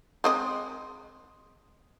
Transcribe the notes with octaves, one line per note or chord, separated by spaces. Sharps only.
G#3 C4 D#5